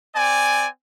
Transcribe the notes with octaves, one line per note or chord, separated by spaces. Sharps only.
C4 D5 G#5